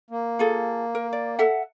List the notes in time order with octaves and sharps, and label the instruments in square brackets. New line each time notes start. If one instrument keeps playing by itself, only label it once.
[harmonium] A#3
[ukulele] F4 G#4 A4
A#4
D5
A4 E5 F#5